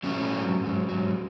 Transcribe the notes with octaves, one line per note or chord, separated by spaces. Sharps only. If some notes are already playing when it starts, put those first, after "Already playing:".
G#2 F#3 A3 C#4
G#2 F#3
G#2 F#3
G#2 F#3